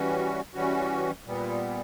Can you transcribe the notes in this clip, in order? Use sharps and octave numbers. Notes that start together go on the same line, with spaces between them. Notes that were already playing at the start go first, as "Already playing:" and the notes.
Already playing: E3 G3 C#4 F#4
E3 G3 C#4 F#4
A#2 G3 B3